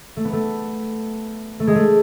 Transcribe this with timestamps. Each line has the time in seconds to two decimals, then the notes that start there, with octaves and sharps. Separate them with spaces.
0.17 A3
0.25 B3
0.33 A3
1.60 A3
1.67 G#3
1.75 A3